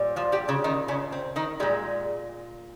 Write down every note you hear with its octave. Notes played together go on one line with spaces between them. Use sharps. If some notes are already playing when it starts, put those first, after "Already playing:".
Already playing: A#2 G3
F3 F4
G3 G4
C#3 C#4
D#3 D#4
C#3 C#4
C4
D#3 D#4
A#2 G3 G#3 G4